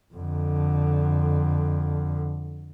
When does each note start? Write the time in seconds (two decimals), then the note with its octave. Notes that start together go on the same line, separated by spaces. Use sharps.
0.14 F2 D3